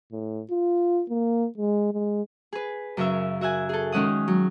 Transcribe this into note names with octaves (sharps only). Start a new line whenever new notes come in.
A2
F4
A#3
G#3
G#3
G#4 B4
F#2 C#3 C#4 A#4 E5
F#4 E5 F#5 G#5
G#4 A4
D#3 G#3 C#4 F#5 D#6
F#3